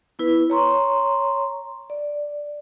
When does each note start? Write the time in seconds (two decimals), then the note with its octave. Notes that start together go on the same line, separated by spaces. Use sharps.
0.19 B3 E4 B4
0.50 C#5 A#5 C6 C#6
1.90 D5